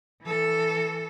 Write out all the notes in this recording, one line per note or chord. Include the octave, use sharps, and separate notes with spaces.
E3 A4